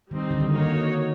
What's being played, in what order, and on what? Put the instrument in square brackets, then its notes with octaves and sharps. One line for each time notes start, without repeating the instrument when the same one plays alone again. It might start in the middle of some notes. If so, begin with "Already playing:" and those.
[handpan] D#3 [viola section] G3 C4 D#4
[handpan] D3
D#3
[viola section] A#3 D#4 F#4 A#4 C#5